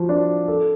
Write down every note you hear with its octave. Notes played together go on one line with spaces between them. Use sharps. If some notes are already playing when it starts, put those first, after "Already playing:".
Already playing: F3 F#4
D4
A4